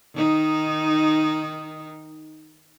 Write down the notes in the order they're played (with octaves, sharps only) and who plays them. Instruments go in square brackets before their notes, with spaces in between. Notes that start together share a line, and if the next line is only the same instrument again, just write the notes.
[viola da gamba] D#3 D#4